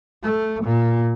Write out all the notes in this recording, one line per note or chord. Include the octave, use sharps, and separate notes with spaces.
A3
A#2